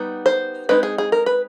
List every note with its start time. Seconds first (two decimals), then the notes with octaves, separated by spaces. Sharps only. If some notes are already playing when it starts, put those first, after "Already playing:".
Already playing: G3 B3 D#4
0.26 C5
0.69 G#3 C4 D#4 B4
0.83 G#4
0.98 G#4
1.12 A#4
1.26 B4